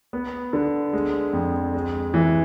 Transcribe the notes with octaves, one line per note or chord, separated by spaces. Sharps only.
B3
D3
G#3
F2
G#3
E3